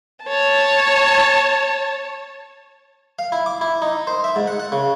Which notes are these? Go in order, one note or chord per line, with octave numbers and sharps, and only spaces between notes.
C#5 A5
F5
E4
D6
E4
D#4
C5
E5
G#2
F#5
F#5
C#3